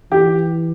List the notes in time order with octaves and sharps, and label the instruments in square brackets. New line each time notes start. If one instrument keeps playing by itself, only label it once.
[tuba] E3 [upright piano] G4